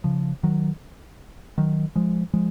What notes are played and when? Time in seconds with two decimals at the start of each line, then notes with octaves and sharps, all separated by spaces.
0.04 C#3 F3
0.43 D#3 F#3
1.58 D#3 F#3
1.95 F3 G#3
2.33 F3 G#3